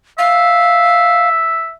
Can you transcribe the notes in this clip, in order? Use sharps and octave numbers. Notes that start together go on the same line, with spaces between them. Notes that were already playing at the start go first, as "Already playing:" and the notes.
E5 F5